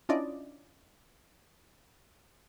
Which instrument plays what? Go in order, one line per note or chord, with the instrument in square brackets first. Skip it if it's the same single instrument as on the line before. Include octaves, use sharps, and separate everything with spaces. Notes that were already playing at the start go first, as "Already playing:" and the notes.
[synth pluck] C#4 D4 E4 F4 D5 D#5